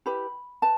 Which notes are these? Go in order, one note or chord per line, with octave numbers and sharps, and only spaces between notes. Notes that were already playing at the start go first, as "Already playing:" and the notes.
E4 G4 B4 B5
B4 A5